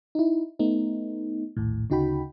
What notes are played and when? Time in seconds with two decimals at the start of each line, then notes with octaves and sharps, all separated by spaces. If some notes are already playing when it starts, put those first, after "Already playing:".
0.15 D#4 E4
0.59 A3 B3 D#4
1.57 A#1 D#2 A2
1.90 D2 C#3 D#4 F#4 G5 B5